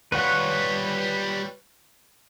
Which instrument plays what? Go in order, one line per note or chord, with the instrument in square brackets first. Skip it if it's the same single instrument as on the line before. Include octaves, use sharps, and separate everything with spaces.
[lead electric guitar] G3 F4 [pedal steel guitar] B4 C#5 F#5